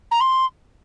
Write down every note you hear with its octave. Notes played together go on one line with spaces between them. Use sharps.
A#5
C6